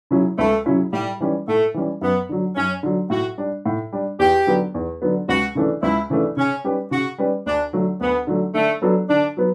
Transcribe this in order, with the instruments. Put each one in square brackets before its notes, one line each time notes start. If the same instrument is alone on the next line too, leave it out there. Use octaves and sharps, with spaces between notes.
[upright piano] C#3 F#3 C#4 E4
[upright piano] C#2 [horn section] A3
[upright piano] C#3 F#3 C#4 E4
[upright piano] A2 [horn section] G3
[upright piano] E3 G3 C#4
[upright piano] A2 [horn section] A3
[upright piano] E3 G3 C#4
[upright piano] F#2 [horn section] B3
[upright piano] D3 F#3
[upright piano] F#2 [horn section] C#4
[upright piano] D3 F#3
[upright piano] A2 [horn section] F#4
[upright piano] G3 D4
A2
G3 D4
[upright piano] E2 [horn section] G4
[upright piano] D3 F#3 B3
E2
D3 F#3 B3
[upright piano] C#2 [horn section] F#4
[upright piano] C#3 E3 A3 D4
[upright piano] C#2 [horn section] E4
[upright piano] C#3 E3 A3 D4
[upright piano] C#3 [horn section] C#4
[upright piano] G3 C#4 G4 B4
[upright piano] C#3 [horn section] F#4
[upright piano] G3 C#4 G4 B4
[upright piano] D2 [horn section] D4
[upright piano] D3 F#3 A3
[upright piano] D2 [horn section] B3
[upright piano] D3 F#3 A3
[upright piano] D3 [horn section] A3
[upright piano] F#3 B3 D4 A4
[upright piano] D3 [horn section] D4
[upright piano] F#3 B3